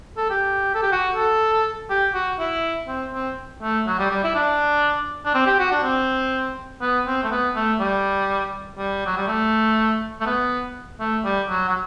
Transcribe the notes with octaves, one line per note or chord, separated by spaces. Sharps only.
A4
G4
A4
G4
F#4
A4
G4
F#4
E4
C4
C4
A3
F#3
G3
G3
E4
D4
D4
C4
G4
F#4
D4
C4
B3
C4
A3
B3
A3
G3
G3
F#3
G3
A3
A3
B3
A3
G3
F#3
F#3